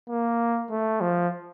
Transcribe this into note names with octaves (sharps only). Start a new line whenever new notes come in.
A#3
A3
F3